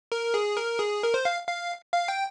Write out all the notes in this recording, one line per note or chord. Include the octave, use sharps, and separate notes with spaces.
A#4
G#4
A#4
G#4
A#4
C5
F5
F5
F5
G5